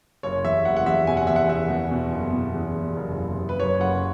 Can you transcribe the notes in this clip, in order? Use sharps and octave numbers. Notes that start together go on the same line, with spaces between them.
F#1 C#5
E2 E5
F#1 F#5
F#5
E2 E5
B2 G#5
F#5
E2 E5
F#5
E2 E5
E2
B2
F#1
B2
E2
E2
F#1
F#1
F#1
B4
F#2 C#5
F#1 F#5